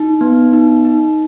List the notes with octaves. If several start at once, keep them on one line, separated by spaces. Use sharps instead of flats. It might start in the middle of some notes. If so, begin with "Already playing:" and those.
Already playing: D#4
B3
D#4
D#4